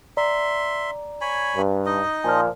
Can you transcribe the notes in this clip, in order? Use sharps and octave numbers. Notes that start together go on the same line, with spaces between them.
D5 E5 A#5 C6
C#5 G#5 B5
G2
D#4 D#5
A#2 F3 G#5 F6